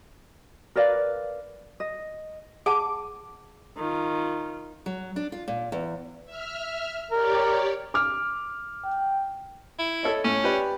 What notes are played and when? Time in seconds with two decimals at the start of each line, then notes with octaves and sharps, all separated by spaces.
0.76 A#4 B4 D5 F5
1.80 D#5
2.66 G#4 F#5 A5 D6
3.77 D#3 F4
4.86 F#3
5.16 D4
5.32 F4
5.48 A#2
5.72 E2
6.26 E5 F6
7.12 G4 A#4 C#5 D5
7.94 D6 F6
8.84 G5
9.79 E4
10.03 A4 C#5 D#5
10.24 A2 C#4
10.44 G4 B4 D5